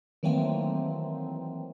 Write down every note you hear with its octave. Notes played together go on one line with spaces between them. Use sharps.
D#3 E3 F#3 A3 A#3 C4